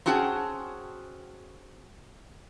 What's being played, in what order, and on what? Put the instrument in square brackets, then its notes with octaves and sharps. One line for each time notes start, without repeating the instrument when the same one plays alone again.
[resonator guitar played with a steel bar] C4 C#4 F#4 G#4 G5 A5